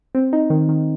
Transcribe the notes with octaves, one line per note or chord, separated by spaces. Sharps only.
C4
D#4
D#3
D#3